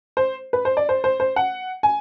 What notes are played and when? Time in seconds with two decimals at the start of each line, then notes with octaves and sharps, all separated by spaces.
0.17 C5
0.53 B4
0.65 C5
0.77 D5
0.89 C5
1.04 C5
1.20 C5
1.36 F#5
1.83 G#5